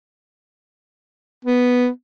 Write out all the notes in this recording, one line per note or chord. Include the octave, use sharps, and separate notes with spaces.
B3